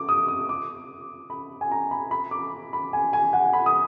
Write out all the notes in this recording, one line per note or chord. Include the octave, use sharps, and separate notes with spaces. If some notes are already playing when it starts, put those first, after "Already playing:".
Already playing: D6
D#6
D#6
D6
B5
G#5
A#5
B5
B5
D6
B5
G#5
G#5
F#5
B5
D#6